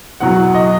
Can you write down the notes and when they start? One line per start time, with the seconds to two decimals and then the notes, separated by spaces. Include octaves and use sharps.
0.20 E2 B2 F#3 F#5
0.54 D#5